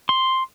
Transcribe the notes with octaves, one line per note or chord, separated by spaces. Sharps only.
C6